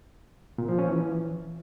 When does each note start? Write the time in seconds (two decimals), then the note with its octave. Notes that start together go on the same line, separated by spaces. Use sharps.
0.58 A#2
0.69 F3
0.79 C#4
0.89 E3